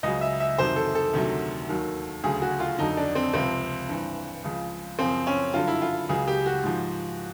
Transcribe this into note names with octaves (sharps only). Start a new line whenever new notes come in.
C#2 C#3 F#3 D#5
E5
E5
F2 C3 D#3 F#3 C5
A4
A4
D2 C3 D#3 F#3
D#2 D#3 F#3
D2 C#3 F#3 G#4
F#4
F4
F2 D3 F#3 D#4
D4
C4
C#2 C3 F3 C4
G2 E3
C#2 C#3 F3
F#2 C#3 F3 C4
C#4
G2 D3 F#3 F4
E4
F4
C#2 C#3 F#3 G#4
G4
F#4
G#2 F3